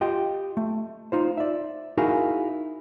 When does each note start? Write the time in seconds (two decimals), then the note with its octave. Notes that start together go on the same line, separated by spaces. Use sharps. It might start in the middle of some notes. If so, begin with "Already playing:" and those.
0.01 F4 G4 D#5 G5
0.57 A3
1.12 D#4 F4 C5
1.37 D5 E5
1.97 D#4 E4 F#4 G#4 A#4 F5